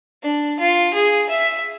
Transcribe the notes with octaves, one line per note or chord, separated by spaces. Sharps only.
D4
F4
G#4
E5